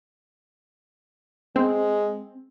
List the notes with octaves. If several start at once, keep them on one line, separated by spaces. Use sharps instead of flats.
G#3 C4